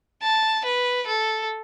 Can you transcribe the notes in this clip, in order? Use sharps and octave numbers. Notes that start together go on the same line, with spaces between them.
A5
B4
A4